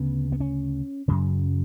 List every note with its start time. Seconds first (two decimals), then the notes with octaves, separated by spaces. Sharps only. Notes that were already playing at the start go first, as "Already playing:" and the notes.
Already playing: D2 C#3 B3
0.32 B3
0.40 C#4
1.08 F#2 C#3 F#3